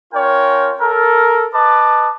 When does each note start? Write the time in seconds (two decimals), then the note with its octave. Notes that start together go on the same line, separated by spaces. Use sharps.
0.14 C#4 F4 A#4 C#5 G5
0.80 A4 A#4
1.55 B4 D#5 A5 D6